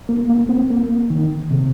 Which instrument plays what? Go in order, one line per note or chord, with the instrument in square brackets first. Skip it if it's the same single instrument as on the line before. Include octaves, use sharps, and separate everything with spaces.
[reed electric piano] A#3
A#3
C4
A#3
D#3
C3